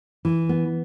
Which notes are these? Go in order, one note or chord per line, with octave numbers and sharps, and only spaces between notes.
E3
B3